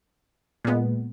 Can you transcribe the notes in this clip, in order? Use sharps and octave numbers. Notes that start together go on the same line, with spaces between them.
A#2 G#3 B3